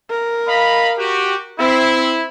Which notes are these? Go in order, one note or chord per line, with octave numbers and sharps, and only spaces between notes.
A#4
D#5 F5 B5
F#4 G4
C4 E4